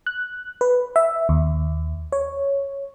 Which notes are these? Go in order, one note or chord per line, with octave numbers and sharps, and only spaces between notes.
F#6
B4
E5
D#2
C#5